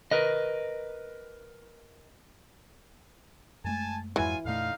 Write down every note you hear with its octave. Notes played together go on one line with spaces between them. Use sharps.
A#4 B4 D#5
F#2 G#3 A3 G#5 A5
F2 G#2 E3 F#3 G#3 F4 G#5
F2 A#2 D3 A3 D#4 F5